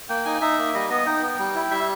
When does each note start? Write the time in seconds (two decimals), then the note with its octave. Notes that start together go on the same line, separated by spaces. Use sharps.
0.09 A#3 G5
0.25 D#4 G#5
0.41 D#4 E5
0.58 A#3
0.74 G3 D#5
0.90 B3 D#5
1.06 D#4 G5
1.22 B3
1.39 G3
1.55 E4
1.71 G3 E5